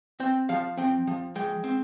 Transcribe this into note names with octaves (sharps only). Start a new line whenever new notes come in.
C4 G5
F3 F5
C4 G5
F3
G#3 G5
C4